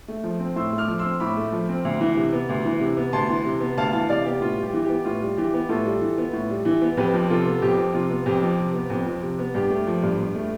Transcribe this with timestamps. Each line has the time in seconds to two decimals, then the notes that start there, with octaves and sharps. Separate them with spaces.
0.08 A3
0.24 F3
0.40 C4
0.56 A2 C6 E6
0.73 A3
0.78 D6 F6
0.88 F3
0.99 C6 E6
1.05 C4
1.20 A2 B5 D6
1.37 A3
1.52 F3
1.69 C4
1.85 D2
2.00 E3
2.17 C3
2.33 B3
2.49 D2
2.65 E3
2.81 C3
2.97 B3
3.13 D2 A5 C6
3.29 E3
3.45 C3
3.60 B3
3.77 D2 F5 A5
3.93 E3 F5 A5
4.09 C3 D5 F5
4.25 B3 G4
4.41 A2 F4
4.58 G3 G4
4.73 E3
4.84 G4
4.89 B3
5.05 A2 F4
5.22 G3
5.37 E3 G4
5.54 B3
5.69 A2 F4 A4
5.86 G3
6.01 E3
6.18 B3
6.33 A2
6.50 G3
6.65 E3
6.82 B3
6.97 F2 G4 B4
7.14 F3
7.29 C3 F4 A4
7.46 B3
7.62 F2 G4
7.78 F3
7.94 C3 F4
8.10 B3
8.26 F2 G4
8.42 F3
8.59 C3
8.74 B3
8.90 F2
9.06 F3
9.22 C3
9.39 B3
9.54 G2 G4
9.70 A3
9.87 F3
10.02 G2
10.18 G2
10.35 A3